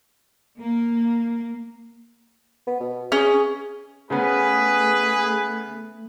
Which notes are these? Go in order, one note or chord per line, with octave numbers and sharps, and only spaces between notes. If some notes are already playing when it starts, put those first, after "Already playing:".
A#3
B3
B2
C#4 G#4
C#3 A3 B3 G#4 B4